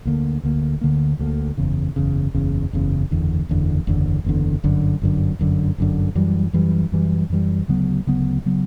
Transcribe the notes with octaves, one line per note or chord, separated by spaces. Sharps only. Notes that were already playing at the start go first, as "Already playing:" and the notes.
D2 D3 A#3
D2 D3 A#3
D2 D3 A#3
D2 D3 A#3
F#1 E2 C#3
F#1 E2 C#3
F#1 E2 C#3
F#1 E2 C#3
F#1 E2 D3
F#1 E2 D3
F#1 E2 D3
F#1 E2 D3
G1 F#2 D3
G1 F#2 D3
G1 F#2 D3
G1 F#2 D3
F#2 E3 G3
F#2 E3 G3
F#2 E3 G3
F#2 E3 G3
D2 C#3 F#3 B3
D2 C#3 F#3 B3
C#3 F#3 B3